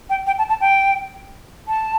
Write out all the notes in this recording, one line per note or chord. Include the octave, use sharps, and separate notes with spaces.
G5
G5
A5
A5
G5
A5